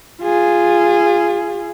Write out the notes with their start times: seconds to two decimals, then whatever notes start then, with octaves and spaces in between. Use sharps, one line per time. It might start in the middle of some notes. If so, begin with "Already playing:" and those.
0.21 F4 G#4